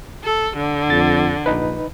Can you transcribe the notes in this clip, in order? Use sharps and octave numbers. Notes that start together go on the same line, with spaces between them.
A4
D3
F2 A6
A#1 D#4 B4